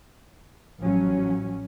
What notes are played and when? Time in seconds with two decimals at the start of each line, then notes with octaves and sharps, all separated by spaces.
0.79 A1 A2 F3 F#3 C#4